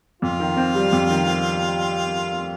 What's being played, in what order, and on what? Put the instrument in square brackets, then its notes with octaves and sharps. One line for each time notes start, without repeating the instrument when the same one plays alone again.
[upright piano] F2 [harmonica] F4
[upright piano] D#3
C4
G3
F2
D#3
C4